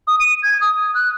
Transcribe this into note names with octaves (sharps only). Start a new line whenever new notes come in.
D#6
D#7
G#6
D#6
F#6